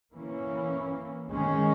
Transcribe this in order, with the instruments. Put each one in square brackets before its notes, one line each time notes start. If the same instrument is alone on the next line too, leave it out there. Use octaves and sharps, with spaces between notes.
[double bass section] E3 A#3 C#4
D#3 G#3 C#4